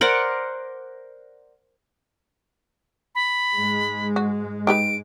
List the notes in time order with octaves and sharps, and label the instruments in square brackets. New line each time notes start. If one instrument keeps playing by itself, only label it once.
[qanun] A#4 C5 D5 F#5
[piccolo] B5
[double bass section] G#2 G#3
[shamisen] F#4
[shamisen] D#4 G4 B4 [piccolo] D7